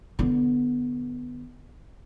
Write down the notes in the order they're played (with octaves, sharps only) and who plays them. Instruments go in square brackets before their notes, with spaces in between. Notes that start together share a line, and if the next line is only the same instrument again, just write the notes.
[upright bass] D3 B3